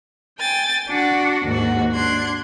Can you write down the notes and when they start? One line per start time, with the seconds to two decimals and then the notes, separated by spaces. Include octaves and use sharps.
0.40 G5 G#5 A6
0.89 D4 F#4
1.46 D#2 G#2 F#4
1.94 D4 C6 F#6 G#6